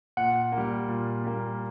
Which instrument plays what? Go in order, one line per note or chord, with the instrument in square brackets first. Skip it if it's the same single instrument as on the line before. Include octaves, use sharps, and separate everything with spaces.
[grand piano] A#2 [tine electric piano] F#5
[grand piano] A#3
G3
A#2
G3 A#3